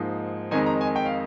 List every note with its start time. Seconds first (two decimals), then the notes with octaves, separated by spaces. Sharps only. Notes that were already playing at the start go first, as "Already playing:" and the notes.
Already playing: G#2 F3 A#3 D#4
0.51 F2 D#3 G#3 D#4 G#5
0.66 A#5
0.81 G#5
0.96 G5
1.06 F5